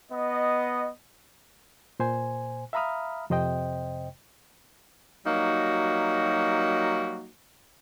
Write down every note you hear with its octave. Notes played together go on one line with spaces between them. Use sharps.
B3 D#5
A#2 C5 G#5
E5 F5 A#5 B5 D#6 F6
F2 C3 C5 D#5 G5
F#3 G3 A#3 D#4 F#4